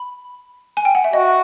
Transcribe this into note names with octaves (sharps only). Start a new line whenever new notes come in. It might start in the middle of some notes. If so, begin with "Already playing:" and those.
Already playing: B5
G#5
G5
F#5
E5
F#4 D#5